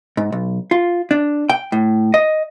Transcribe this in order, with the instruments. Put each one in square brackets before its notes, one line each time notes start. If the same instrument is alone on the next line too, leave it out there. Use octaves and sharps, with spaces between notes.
[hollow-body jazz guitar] G#2
B1
F4
D4
G5
A2
D#5